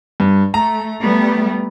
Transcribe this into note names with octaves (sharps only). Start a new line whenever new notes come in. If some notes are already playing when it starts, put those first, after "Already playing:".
G2
A3 A#5
G3 A3 B3